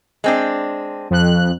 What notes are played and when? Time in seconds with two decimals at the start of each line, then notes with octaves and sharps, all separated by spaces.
0.24 G#3 C4 D4
1.10 F2 F#6